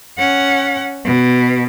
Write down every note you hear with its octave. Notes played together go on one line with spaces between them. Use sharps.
C#4 F#5
B2